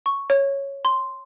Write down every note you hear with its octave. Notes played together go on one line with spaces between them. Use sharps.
C#6
C#5
C6